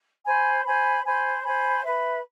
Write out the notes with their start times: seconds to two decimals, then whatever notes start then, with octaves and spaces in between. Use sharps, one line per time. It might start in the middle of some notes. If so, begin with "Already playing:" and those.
0.25 C5 G#5 B5
0.64 C5 G#5 B5
1.04 C5 G#5 B5
1.42 C5 G#5 B5
1.83 B4 E5 B5